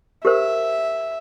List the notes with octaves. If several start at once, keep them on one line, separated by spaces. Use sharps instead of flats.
G4 A#4 C5 E5